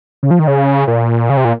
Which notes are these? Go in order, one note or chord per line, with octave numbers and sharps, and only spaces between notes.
C#3
F3
D#3
C#3
A#2
C#3
C3
A#2